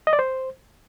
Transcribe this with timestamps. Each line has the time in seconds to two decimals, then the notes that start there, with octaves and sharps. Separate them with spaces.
0.07 D#5
0.13 D5
0.19 C5